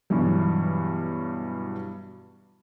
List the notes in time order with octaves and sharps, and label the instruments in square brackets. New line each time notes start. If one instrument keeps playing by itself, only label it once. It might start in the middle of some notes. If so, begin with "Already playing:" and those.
[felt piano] G2 B2 E3 F#3